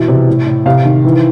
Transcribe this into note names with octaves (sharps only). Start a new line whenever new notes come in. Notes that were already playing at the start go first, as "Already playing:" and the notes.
Already playing: B2 E3 E5
C3
A2
A2
C3 F5
D#3
E3